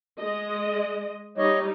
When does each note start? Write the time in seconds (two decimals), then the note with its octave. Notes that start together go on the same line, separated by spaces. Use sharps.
0.19 G#3 D#5
1.38 G3 D#4 C#5 D#5